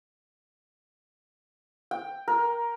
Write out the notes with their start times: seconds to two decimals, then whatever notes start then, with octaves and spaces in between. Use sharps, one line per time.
1.91 G5
2.28 A#4